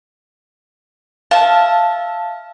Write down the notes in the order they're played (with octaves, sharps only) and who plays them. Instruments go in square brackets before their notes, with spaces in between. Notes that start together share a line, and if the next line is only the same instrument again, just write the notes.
[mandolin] E5 A5 [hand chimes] F5